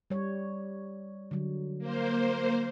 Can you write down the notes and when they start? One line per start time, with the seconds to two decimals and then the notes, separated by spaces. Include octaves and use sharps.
0.10 G3 C#5
1.31 D3 F#3
1.79 A#3 C5